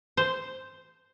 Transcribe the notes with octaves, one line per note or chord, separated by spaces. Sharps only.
C5